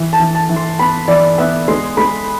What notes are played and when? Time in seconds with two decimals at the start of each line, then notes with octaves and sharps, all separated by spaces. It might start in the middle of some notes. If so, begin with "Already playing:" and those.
Already playing: E3
0.13 A5
0.20 E3
0.35 A5
0.49 E3
0.56 C6
0.79 B3 B5
1.08 E3 D5
1.38 B3 E5
1.68 G#3 C6
1.97 G#3 B5